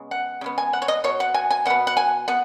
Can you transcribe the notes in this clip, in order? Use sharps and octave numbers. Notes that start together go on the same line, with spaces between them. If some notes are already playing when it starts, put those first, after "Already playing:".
Already playing: C#3 G#3 B3
F#5
C#3 G#3 B3
G#5
F#5
C#5
D#5
B2 B3 C#5
F#5
G#5
G#5
B2 B3 F#5
F#5
G#5
B3 F#5